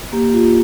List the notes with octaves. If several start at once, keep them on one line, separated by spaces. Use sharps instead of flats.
A#3 G4
F4